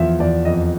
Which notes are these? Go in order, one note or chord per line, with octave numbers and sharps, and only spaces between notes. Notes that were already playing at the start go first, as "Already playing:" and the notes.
Already playing: E2 F3 E5
E2 D5
F2 D#5